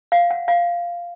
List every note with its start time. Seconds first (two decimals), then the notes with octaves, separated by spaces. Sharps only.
0.12 F5
0.31 F#5
0.48 F5